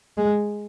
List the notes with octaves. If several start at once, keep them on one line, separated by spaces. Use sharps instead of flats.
G#3